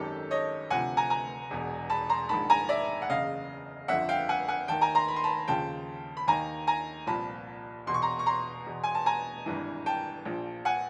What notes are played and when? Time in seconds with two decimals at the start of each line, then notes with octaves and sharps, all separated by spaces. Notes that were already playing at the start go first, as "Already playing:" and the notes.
Already playing: G#1 F#2 D#3 G4 A4
0.31 C#5 D#5
0.70 D2 C3 F3 F#5 G#5
0.97 G#5 A#5
1.10 G#5 A#5
1.50 E1 E2 B2
1.90 A5 B5
2.10 A#5 C6
2.29 A#1 G#2 D#3 A5 B5
2.50 G#5 A#5
2.69 D5 E5
3.02 F#5
3.09 F#1 E2 C#3 D#5 F5
3.88 G1 F2 D3 F3 E5 F#5
4.09 F5 G5
4.29 F#5 G#5
4.48 F#5 G#5
4.68 D#2 D#3 G5 A5
4.81 G#5 A#5
4.95 A#5 C6
5.08 B5
5.16 C6
5.24 A5 B5
5.48 D#2 C#3 F3 G5 A5
6.17 B5
6.28 D#2 D#3 G#5 A#5
6.67 G#5 A#5
7.07 C2 A#2 F3 A5 B5
7.87 E2 B2 C6
7.94 C#6
8.02 A#5 C6
8.19 C#6
8.26 A#5 C6
8.66 E2 B2
8.84 G#5
8.95 A5
9.06 G#5 A#5
9.46 G#1 G2 E3
9.86 G5 A5
10.25 A#1 A#2 F3
10.65 F#5 G#5